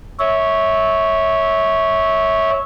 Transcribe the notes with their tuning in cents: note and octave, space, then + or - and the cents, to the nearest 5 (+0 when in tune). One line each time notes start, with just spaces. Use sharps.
C#5 +0 E5 -20